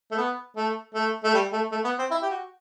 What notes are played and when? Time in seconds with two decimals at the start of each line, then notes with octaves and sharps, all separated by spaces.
0.11 A3
0.17 B3
0.56 A3
0.95 A3
1.24 A3
1.34 G3
1.53 A3
1.72 A3
1.85 B3
1.98 C4
2.11 E4
2.23 G4
2.30 F#4